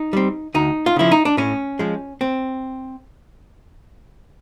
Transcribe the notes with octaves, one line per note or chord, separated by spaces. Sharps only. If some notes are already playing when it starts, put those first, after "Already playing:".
Already playing: D#4
G3 C4
D2 D#4
F4
C#3 F3 E4
D#4
D4
A2 C#4
F3 G#3
C4